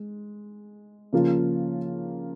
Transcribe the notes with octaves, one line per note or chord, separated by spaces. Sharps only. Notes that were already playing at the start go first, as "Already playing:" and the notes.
Already playing: G#3
C#3 F3 A#3 F4